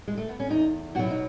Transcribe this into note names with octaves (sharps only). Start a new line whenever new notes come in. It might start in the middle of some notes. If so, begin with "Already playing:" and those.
G#3
A3
B3
C#4
E2 D#4
B2 F#3 E4 F#4
D#4